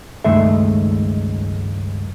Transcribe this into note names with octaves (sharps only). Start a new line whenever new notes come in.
C#2 G2 D#3 G#3 A3 E5